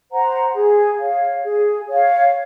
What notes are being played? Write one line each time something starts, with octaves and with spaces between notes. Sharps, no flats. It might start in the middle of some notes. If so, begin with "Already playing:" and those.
C5 F#5 A#5
G#4
C#5 F5
G#4
C#5 F5